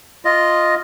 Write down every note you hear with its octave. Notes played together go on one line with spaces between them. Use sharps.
F4 D#5